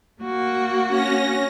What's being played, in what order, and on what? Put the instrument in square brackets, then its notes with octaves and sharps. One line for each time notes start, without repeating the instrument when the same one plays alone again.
[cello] A#3 F#4
[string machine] C#4 A#6